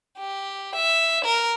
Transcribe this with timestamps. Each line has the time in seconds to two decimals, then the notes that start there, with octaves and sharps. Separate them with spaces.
0.18 G4
0.76 E5
1.25 A#4